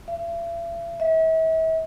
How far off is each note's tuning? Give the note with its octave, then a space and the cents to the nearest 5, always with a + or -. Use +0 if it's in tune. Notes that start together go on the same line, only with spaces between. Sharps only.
E5 +45
E5 -40